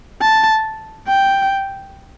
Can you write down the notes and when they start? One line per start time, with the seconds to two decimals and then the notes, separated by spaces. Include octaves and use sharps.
0.21 A5
1.08 G5